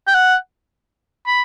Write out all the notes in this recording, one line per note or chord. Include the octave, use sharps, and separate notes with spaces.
G5
F#5
B5